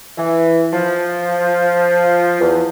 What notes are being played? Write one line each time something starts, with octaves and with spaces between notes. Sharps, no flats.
E3
F3
E2